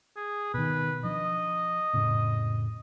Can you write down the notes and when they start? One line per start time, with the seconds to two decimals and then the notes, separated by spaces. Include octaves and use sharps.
0.16 G#4
0.54 B2 D#3 B4
1.04 F3 D4 D#5
1.93 F2 A2 C#3